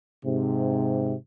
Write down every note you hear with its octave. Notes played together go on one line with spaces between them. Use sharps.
G#2 C3